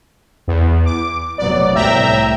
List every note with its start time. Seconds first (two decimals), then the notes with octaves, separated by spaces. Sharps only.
0.48 E2
0.85 D6
1.38 F1 F#3 B3 D5
1.75 C2 A2 E5 G5 A#5